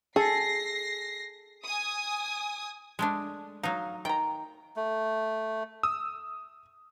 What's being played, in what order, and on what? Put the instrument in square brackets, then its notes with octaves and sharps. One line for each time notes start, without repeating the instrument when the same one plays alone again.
[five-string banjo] G#4 [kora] A4 [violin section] A#6 C7
[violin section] G#5 D#6
[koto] G#3 A3 D4
[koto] F#3 D#4 [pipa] F5
[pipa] D#3 A#5 [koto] G5
[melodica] A3
[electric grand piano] D#6 E6